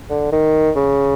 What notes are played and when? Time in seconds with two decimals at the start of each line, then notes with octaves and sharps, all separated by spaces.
0.10 D3
0.32 D#3
0.76 C#3